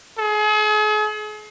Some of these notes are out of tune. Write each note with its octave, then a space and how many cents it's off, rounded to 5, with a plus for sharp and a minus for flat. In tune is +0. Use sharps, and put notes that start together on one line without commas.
G#4 +40